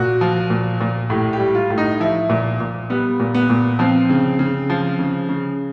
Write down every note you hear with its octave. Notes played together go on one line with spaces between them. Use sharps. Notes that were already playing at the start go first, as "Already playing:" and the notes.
Already playing: A#2 F#4
F3
A#2
A#2
A2 G4
G4
G3
F4
A2
D#4
F3 E4
A#2
A#2
G3 B3
A#2
B3
A#2
F3 C4
C#3
C#3
F3
C#3
C#3